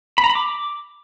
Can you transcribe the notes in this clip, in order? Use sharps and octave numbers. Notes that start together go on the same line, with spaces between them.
B5
A#5
B5
D6